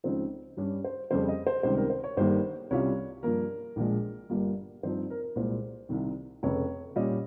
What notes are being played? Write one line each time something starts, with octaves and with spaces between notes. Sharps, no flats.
C#2 C#3 F3 C4 D#4 C5
G2 G3 C#4
C5
F2 C#3 G3 C5
D#5
C5
C#2 C3 D#3 G3 C5
A#4
C5
C#5
G1 G2 D#3 G3 A#3 C5
C2 C3 G3 C#4 F4 C#5
G2 F3 A#3 A#4
A#1 A#2 F3 G#3
G1 G2 G3 A#3 F4
G2 F3 C4 D#4 C5
A#4
A#4
C2 A#2 G#3 C5
C2 C3 D#3
F1 F2 C#3 C#5
A#2 G3 C#4 F4 D#5